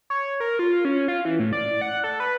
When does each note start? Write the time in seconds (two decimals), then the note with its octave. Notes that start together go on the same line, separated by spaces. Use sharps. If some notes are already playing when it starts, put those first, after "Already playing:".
0.10 C#5
0.40 A#4
0.59 F4
0.85 C#4
1.08 F4
1.25 E3
1.39 A2
1.53 D5
1.81 F#5
2.04 A4
2.20 B4